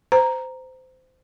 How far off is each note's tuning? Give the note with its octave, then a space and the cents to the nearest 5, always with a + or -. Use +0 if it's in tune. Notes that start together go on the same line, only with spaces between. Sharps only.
C5 -25 A#5 +0